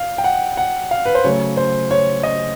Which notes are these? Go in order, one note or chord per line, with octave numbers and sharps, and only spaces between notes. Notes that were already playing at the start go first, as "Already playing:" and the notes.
Already playing: F5
G5
F#5
F#5
F5
B4
C5
C#3 F#3 A3 C#5
C5
C#5
D#5